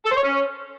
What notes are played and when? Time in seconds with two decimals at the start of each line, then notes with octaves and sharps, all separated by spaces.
0.04 A4
0.10 C5
0.16 C#5
0.22 C#4